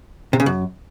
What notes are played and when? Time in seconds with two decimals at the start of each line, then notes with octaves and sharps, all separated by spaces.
0.33 C3
0.40 C#3
0.46 F#2